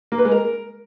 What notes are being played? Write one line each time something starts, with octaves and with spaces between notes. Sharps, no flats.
A#3
B4
G#3
A#4